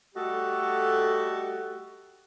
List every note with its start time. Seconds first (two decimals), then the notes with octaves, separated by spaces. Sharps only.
0.15 G3 A3 F#4 G4 A4 D#5